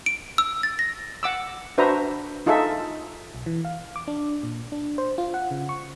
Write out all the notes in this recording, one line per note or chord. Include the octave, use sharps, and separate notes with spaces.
D7
E6
A6
A#6
F#5 D6 E6
D4 F#4 B4 C5 E5 A#5
D#4 F4 G#4 A4 E5
B1
E3
F5
D6
D4
A#2
D4
C5
F4
F#5
C#3
C#6